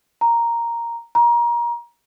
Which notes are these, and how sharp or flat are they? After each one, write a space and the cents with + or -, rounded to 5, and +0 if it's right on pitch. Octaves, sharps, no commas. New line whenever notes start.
A#5 +0
A#5 +25